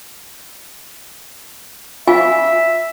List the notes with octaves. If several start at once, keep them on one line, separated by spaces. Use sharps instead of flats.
F4 E5 F5 G#5